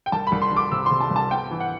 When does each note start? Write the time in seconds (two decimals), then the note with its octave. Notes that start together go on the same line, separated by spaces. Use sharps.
0.06 G5
0.12 C2 A5
0.27 B5
0.32 C2
0.42 C6
0.52 C2 D6
0.72 C3 E6
0.86 C6
0.91 C3
1.01 A5
1.11 C2
1.16 A5
1.30 B3 G5
1.51 E3
1.60 F#5